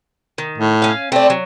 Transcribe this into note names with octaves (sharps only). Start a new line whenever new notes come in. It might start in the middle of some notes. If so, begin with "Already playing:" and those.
D#3
A2
C#4 F5
A3 C4 D5
F#3